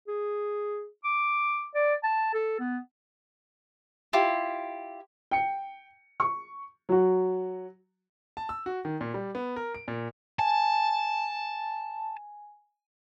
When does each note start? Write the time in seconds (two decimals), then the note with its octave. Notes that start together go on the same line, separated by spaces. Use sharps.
0.08 G#4
1.04 D6
1.75 D5
2.04 A5
2.34 A4
2.59 B3
4.13 E4 F4 G4
5.31 G5 C#7
6.20 C#6
6.89 F#3 F#4
8.37 A5
8.49 E6
8.66 F#4
8.85 D#3
9.01 A#2
9.14 G3
9.35 B3
9.56 A#4
9.75 D7
9.88 A#2
10.39 G#5 A5